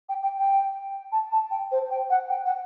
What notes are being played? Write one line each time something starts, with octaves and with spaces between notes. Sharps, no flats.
G5
G5
G5
A5
A5
G5
C5
G5
F#5
G5
F#5